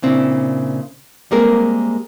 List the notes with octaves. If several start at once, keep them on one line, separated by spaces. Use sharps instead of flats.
A#2 C#3 C4 D4 E4
G3 G#3 A#3 C4 G#4 A#4